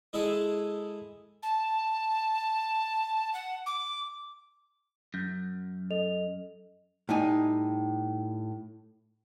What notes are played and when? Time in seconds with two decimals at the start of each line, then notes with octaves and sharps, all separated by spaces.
0.13 G#3 E4 G#4 A4 E5
1.43 A5
3.34 F#5
3.66 D6
5.14 F#2 G6
5.90 A4 D#5 F7
7.09 A2 G3 D#4 G#5